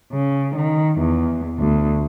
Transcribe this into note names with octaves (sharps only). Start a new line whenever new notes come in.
C#3
D#3
E2
D2